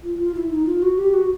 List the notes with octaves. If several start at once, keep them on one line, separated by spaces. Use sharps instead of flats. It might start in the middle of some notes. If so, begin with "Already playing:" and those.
F4
F4
E4
D#4
F4
F#4
G4
F#4